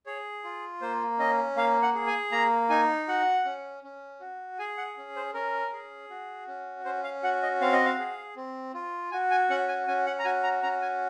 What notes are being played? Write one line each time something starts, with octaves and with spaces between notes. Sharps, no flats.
G#4 C#5
F4
A#3 C5
C#4 D#5
A#3 F5
F#5
G#4
G#5
A#3 A#5
D#4 G#5
F#4 F#5
C#4
C#4
F#4
G#4 G#5
F#5
C#4
C5
C#4 A#4
G#4
F#4
C#4
C#4 C5
F5
F#4 F#5
D#5
C4 F5
D#5
F5
G#4
C4
F4
F#4 G#5
G#5
C#4 F#5
G#5
C#4 G#5
F#5
A#5
F#4 G#5
A#5
C#4 A#5
G#5